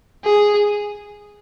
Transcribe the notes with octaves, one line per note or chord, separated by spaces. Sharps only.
G#4